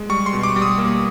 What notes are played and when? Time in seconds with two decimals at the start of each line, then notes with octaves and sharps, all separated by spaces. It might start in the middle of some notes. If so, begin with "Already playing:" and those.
Already playing: G#3
0.09 G3 C#6
0.26 C6
0.33 B2
0.43 D6
0.56 G3
0.62 D#6
0.78 A#3